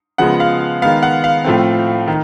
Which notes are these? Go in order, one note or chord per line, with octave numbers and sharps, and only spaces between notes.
C#3 F3 G#3 B3 F#5
F5
D#3 G#3 B3 F5
F#5
F5
A2 F3 A3 C4
D#3